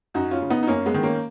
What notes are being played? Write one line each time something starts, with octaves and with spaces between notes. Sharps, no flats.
F#2 D#4 F#4
C#4 F4
C#3
B3 D#4
D#4
F#2 A#3 C#4
G#3 B3
D#3
A#3 C#4